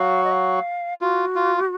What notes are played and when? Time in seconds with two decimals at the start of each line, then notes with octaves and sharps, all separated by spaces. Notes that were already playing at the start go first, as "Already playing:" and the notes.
Already playing: F#3 F#4 F5
0.24 D#5
0.32 F5
1.01 F4 F#4
1.36 F4